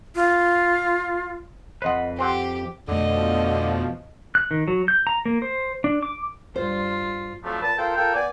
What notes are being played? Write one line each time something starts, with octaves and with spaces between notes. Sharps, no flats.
F4
F2 B4 C5 D#5 F#5
C4 G4 C5 F#5
F2 B2 D3 F3 A3 D#5
F#6
D#3
F#3
G6
A#5
A#3
C5
D4
D6
G2 F4 C5
F2 F3 F#3 A3 D4
A#2 B4 A5
F4 A4 A#4 C5 G5
F4 A4 A#4 G5
B3 D5 G#5